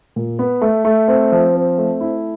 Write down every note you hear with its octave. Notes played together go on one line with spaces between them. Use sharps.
A#2
B3
A3
A3
C4
F3
C4
A3
E4